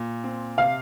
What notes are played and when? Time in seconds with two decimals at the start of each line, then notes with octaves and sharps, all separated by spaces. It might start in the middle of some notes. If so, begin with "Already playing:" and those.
Already playing: A#2
0.24 C4
0.58 C3 F5